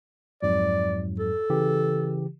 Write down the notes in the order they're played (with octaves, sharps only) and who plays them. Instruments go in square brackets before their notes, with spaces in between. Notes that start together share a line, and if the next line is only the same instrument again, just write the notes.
[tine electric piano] F2 G#2 F#3 [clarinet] D5
[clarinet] A4
[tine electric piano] C#3 E3 G4